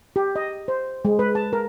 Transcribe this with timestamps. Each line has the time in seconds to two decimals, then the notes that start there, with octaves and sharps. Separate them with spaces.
0.16 G4
0.36 D#5
0.68 C5
1.05 G#3
1.19 B4
1.35 A5
1.53 A#4